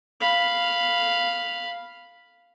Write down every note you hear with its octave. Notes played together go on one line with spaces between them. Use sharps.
F5 B5